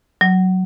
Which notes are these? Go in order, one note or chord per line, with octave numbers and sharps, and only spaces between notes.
F#3